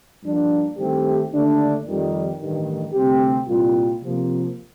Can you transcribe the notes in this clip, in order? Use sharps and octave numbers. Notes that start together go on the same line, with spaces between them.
G2 F3 A#3 D4
G2 D#3 A3 C4 G4
D#2 D3 A3 D4
F2 D#3 G3
A1 G2 D#3
D2 C3 G3 C4 G4
C2 A#2 G3 A#3 F4
C3 F3 A#3